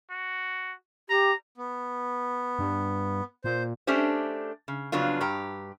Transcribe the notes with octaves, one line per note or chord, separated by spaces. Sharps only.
F#4
G4 A#5
B3
G2
A#2 C5
A3 C#4 D4 G4 C5
C#3
F2 C#3 F#3 B3 D4 F4
G2 G4 A#5